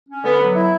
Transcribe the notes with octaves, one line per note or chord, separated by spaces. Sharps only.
C#4
D3 B3
F#3
E4